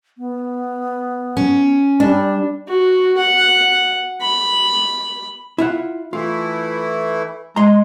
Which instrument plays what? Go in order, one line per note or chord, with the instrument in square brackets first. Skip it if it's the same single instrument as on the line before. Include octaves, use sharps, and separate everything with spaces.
[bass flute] B3
[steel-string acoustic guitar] C#4
[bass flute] G3 [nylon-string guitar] D4
[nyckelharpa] F#4
F#5
B5
[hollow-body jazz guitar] E4 F4 F#5
[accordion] E3 A3 E4 [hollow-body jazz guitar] F4
[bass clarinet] G#3 [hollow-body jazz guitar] A#5 C6